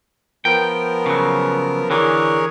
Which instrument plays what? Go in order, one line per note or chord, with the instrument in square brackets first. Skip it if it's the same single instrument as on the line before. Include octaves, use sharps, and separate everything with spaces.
[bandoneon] F3 B3 A#4 [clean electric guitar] G5
[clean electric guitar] C#3 F#3
[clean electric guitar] D3 E3 [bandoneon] G#4 A#4 C#5